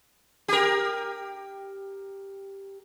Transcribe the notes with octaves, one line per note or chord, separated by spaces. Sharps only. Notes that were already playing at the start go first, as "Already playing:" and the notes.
G4 A#4